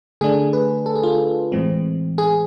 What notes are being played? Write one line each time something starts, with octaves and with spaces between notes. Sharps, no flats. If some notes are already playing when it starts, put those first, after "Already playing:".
D3 A3 D4 G#4
B4
A4
G#4
F4
G#4
A2 E3 G#3 C4
G#4